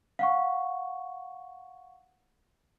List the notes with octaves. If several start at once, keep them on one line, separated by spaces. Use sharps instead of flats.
F5 F#5 C#6